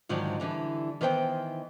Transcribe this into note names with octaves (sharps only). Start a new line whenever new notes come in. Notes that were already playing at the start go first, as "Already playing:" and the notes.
G#2 D3 D#3 F3 F#3
D3 E3 G3
D#3 E3 B3 C5 E5 G5